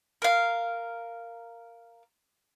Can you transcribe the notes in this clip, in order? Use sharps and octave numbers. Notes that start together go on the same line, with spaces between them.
A#4 F5